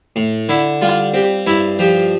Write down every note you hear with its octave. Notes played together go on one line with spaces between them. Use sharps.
A2
D3 E4
G3 F4
C4 G4
G2 E4
F3 G4